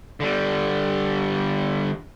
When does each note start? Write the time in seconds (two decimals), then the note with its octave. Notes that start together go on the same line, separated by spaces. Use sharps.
0.20 D3 G3